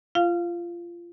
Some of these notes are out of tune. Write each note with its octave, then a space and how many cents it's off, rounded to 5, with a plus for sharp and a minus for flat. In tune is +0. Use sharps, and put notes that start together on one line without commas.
F4 -20 F5 +0